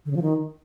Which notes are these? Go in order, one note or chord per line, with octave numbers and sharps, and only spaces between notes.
D3
C#3
F3
D#3